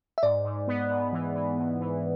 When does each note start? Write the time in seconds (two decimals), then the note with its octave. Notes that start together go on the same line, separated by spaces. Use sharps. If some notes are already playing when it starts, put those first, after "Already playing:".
0.18 E5
0.23 G#2 D5
0.45 G#2
0.68 B3
0.90 G#2
1.13 E3
1.35 E3
1.58 G#2
1.80 E3